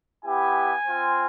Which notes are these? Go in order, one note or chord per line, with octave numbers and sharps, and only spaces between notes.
B3 E4 G4 G#5
C4 F4